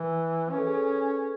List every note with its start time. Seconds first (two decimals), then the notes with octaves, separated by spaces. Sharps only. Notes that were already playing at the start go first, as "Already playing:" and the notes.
Already playing: E3
0.50 C#4 B4
0.58 A4
0.67 G#4
0.75 A4